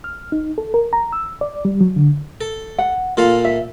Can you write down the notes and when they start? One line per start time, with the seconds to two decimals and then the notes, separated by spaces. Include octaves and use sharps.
0.04 F6
0.32 D#4
0.58 A4
0.74 A#4
0.93 A#5
1.13 E6
1.41 D5
1.65 G3
1.81 F#3
1.96 D3
2.41 A4
2.78 F#5
3.17 A#2 F4 A4 F5
3.45 E5